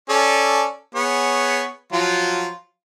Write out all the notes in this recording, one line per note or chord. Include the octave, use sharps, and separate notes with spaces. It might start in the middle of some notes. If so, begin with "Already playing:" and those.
C#4 A4 D5
B3 G#4 C#5
F3 F#3 F4